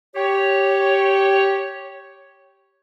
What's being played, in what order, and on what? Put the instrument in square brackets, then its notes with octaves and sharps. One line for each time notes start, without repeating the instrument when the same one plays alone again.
[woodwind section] G4 C#5